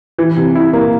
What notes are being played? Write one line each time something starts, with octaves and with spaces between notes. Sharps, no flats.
E3
C3
E4
A#3